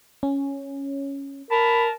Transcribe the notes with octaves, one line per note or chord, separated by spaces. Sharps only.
C#4
A#4 A5 B5